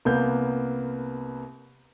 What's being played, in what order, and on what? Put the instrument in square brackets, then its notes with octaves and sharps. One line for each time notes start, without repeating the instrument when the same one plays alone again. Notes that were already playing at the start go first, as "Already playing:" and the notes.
[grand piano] C2 A#3 B3 G6